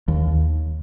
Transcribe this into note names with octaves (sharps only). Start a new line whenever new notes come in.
D#2